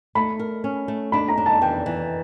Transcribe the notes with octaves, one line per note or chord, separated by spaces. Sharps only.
A3 B5
A#4
C#4
A3
D4 B5
A#5
D4
A5
E3 G5
E3